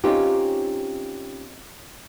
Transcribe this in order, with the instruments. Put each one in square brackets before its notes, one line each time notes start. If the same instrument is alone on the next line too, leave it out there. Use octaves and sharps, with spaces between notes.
[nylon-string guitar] C4 C#4 D#4 F4 G4